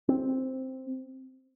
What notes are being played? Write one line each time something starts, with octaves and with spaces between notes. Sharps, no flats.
C4